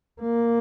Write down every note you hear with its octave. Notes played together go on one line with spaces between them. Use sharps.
A#3